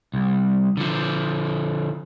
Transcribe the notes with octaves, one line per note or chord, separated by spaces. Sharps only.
C2
D3 F3